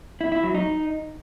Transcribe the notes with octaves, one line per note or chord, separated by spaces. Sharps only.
E4
E4
F#3
D#4